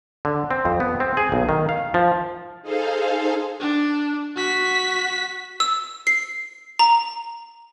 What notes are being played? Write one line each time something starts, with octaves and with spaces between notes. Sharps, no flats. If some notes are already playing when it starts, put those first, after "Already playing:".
D3
C4
F2
B3
C4
G#4
B1
D#3
F5
F3
D#4 G#4 A4 C5 F5
D4
F#4 B6
E6
C7
A#5